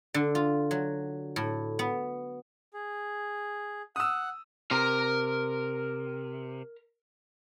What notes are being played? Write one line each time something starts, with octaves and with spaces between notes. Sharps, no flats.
D3
F4
F#3
A2
B3
G#4
F#5 D#6 E6
C3 A#4 A#5